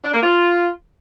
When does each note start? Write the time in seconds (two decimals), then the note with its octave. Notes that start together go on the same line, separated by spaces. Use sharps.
0.04 D4
0.14 A#3
0.23 F4